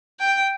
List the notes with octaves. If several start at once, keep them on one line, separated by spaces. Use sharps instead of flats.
G5